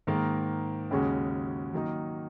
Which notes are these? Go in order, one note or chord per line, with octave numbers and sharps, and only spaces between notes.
G#2 D#3 A#3
D#2 C#3 G#3 C#4 F#4
D#3 F#3 A#3 D#4